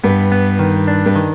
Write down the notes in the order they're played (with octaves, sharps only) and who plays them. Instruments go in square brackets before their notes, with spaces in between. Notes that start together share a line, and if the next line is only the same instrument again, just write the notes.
[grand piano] G2 [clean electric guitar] B3
[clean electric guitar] B3
D#3
D4
[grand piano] G2
[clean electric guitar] D#3